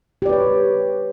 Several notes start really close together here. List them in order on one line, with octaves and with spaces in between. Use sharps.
G4 D5 B4 C#5